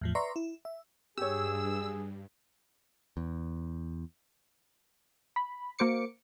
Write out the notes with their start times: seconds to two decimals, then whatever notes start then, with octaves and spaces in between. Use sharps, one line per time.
0.01 E2 A2 F3
0.15 B4 D5 E5 A#5 C6 C#6
0.36 E4
0.65 E5
1.18 G2 G4 G#4 C#5 E6
3.17 E2
5.36 B5
5.79 A#3 F#4 C5 D6 C#7